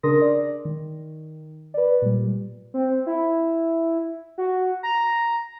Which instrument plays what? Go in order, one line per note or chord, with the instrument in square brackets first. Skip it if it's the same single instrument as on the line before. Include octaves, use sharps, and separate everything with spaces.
[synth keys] C#3 D4 A#4 C6 D#6 A#6
D5
D#3
B4 D5
A#2 G3
[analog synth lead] C4
E4
F#4
A#5